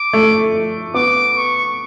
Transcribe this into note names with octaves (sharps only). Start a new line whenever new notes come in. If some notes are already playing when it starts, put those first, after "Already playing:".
Already playing: D6
A3
B3 D6
C#6